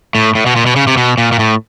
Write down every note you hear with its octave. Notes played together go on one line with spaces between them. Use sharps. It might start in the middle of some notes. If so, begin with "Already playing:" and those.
A2
A2
B2
A#2
B2
C#3
C3
B2
A#2
A#2
A2